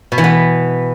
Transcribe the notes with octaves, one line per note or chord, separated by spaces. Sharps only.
B2
E3
B3